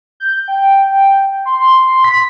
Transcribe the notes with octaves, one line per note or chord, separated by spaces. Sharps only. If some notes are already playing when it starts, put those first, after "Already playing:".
G6
G5
C6
B6